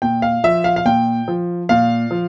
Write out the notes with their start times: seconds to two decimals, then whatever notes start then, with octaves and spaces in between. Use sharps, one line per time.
0.02 A#2 G5
0.22 F5
0.44 F3 E5
0.64 F5
0.76 F5
0.85 A#2 G5
1.28 F3
1.69 A#2 F5
2.11 F3